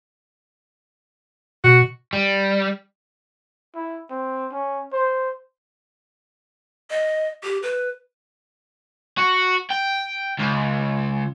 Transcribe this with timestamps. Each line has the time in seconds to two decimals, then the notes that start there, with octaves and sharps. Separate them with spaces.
1.64 B2 F#4
2.13 G3
3.76 E4
4.11 C4
4.52 C#4
4.93 C5
6.90 D#5
7.43 G4
7.63 B4
9.18 F#4
9.71 G5
10.39 C#2